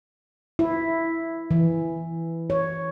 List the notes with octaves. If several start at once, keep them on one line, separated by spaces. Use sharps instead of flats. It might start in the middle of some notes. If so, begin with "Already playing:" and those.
E4
E3
C#5